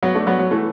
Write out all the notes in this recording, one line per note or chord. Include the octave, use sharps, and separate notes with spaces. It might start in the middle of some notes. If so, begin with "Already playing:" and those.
F#3 B3
A3 D4
F#3 B3
F#3
E3 A3